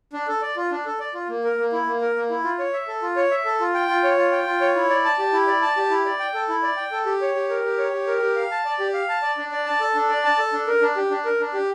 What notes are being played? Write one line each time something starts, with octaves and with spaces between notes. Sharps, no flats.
D4
A4
D5
F4
D4
A4
D5
F4
A#3
A#4
A#3
E4
A#3
A#4
A#3
E4
F4
C#5
E5
A4
F4
C#5
E5
A4
F4
G5
F4
C#5
F4
G5
F4
C#5
E4
D5
A5
G4
E4
D5
A5
G4
E4
D5
G5
A4
E4
D5
G5
A4
G4
C#5
G4
A#4
G4
C#5
G4
A#4
G4
F5
A5
D5
G4
F5
A5
D5
D4
D5
A5
A4
D4
D5
A5
A4
D4
A#4
D4
G4
D4
A#4
D4
G4